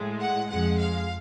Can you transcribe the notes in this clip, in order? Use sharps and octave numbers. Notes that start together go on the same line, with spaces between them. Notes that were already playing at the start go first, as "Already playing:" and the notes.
Already playing: A2 G#3
F#5
F2 F3 G#3 F#5
F5